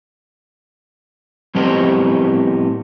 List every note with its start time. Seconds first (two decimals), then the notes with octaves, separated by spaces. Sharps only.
1.55 A2 F3 B3 C4 G4 D#5